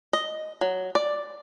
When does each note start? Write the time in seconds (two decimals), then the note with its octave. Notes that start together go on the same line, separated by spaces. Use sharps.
0.13 D#5
0.61 F#3
0.95 D5